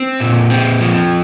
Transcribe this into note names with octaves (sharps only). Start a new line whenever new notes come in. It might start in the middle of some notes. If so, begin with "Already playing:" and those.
Already playing: C4
A#2
C4
F3